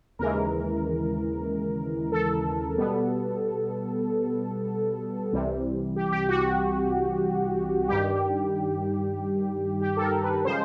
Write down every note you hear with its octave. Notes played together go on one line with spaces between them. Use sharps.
D#2 C#3 E3 G#3 A#4
A4
B2 G3 B3
C2 C3 E3 G3
G4
G4
F#4
G2 D#3 G3 G4
G4
A4
A#4
B4
C#3 F3 G#3 C5